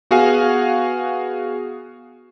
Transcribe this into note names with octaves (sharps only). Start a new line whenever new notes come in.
B3 F#4 G#4 F5 G#5